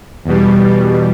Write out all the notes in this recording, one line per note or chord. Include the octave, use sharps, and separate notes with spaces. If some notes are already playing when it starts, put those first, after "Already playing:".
E2 B2 G3